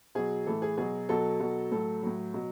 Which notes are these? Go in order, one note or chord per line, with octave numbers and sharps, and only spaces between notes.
B2 F#3 G#4
A2 E3 A4
G#4
B2 F#3 G#4
B2 F#3 A4
B2 F#3
A2 F#3 A4
A2 F#3
B2 F#3